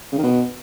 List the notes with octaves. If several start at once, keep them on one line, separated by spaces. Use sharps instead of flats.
C#3
D#3
B2